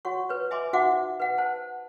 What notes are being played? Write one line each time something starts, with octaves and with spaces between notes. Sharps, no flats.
F#4 C#5 F#5 C#6
B4 C#5
D#5 E5 G#5 B5 C6 D6
D#4 F#4 C5 E5 F#5 D6
B4 F#5
C5 F#5 A5